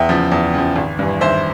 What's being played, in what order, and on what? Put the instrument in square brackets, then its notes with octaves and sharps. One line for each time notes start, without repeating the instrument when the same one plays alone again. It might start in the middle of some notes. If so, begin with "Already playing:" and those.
Already playing: [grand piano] E2 E5 G5
C#3 F3
E2
C#3 F3
G#1
G2 E3
G#1 C5 E5